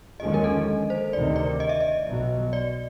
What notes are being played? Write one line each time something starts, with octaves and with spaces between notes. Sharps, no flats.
D#2 D3 F3 G#3 C#4 D#5
A#4
A4
C5
D2 C3 D#3 D5
D5
D#5
E5
D#5
B1 B2 F#3
D5